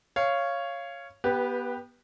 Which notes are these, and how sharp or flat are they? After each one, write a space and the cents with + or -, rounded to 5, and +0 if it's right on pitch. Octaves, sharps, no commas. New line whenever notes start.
C#5 +0 F5 -15
B3 -25 G4 +0 B4 +0